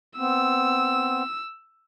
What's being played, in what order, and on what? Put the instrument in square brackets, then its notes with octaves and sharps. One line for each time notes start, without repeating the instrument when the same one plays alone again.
[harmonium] B3 C4 [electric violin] E6